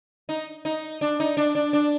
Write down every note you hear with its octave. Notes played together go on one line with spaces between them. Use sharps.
D#4
D#4
D4
D#4
D4
D4
D4